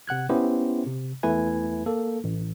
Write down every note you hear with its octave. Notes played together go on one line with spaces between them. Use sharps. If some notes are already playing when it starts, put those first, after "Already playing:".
C3 F#5 F#6 G#6
B3 C#4 E4 G4 C5
C3
E2 A3 E4 B4 G#5 G#6
A#3 A4
A1